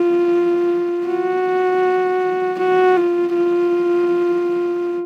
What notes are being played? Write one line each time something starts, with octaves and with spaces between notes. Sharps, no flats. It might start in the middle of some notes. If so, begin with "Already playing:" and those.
Already playing: F4
F#4
F#4
F4
F4